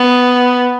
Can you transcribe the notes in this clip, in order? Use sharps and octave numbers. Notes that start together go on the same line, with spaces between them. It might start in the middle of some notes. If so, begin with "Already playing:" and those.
Already playing: B3